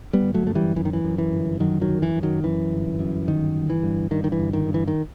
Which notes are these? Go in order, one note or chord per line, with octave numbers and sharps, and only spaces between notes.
G3 B3
G1
F#3 A3
F#2 A3
E3 G3
F#2 E3
D#3
E3
F#2
E3
G1
F#2 D#3 F#3
D#3 F#3
F#2
E3
F#2
D#3 F#3
F#2 E3
G1
F#2
G1 D#3
G1
E3
G2
G2 D#3
D#3
E3
G1
D#3
G2
E3
D#3